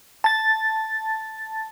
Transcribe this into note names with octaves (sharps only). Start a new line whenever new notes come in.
A5 A6